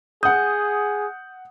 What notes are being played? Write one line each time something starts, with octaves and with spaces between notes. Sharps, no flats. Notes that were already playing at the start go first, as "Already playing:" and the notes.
G#4 F#5 D#6 G6